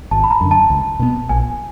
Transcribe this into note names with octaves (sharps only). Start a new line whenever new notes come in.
G#1 A5
B5
A#5
F#2 D3
A5
C#2
B2 G#3 B3
A#1 G#5